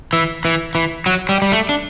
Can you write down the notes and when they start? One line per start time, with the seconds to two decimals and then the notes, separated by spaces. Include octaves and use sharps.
0.13 E3
0.45 E3
0.75 E3
1.06 F#3
1.29 G3
1.42 G3
1.52 A3
1.69 D4